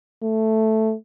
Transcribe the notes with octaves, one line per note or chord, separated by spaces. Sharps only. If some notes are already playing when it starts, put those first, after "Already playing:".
A3